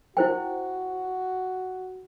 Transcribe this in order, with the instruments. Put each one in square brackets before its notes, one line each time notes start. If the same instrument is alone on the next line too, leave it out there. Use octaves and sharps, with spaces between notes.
[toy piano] E4 C5 G5 [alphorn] F#4